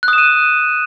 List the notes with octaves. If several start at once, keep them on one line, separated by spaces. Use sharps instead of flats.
F#6
D#6
E7
D#7